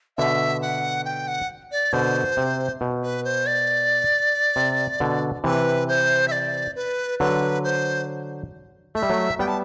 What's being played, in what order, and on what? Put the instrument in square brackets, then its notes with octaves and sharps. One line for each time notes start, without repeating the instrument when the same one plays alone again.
[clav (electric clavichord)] B2 D3 [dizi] E5
[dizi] F#5
G5
F#5
D5
[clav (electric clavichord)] B2 D3 [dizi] C5
[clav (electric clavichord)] C3
B2
[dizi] B4
C5
D5
[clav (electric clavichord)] C3
B2 D3
[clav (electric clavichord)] C3 E3 [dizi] B4
[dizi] C5
E5
D5
B4
[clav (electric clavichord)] D3 F#3 [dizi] B4
[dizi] C5
[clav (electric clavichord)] A3 [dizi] E5
[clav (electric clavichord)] G3
F#3 A3
[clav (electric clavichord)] G3 B3 [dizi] G5
[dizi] A5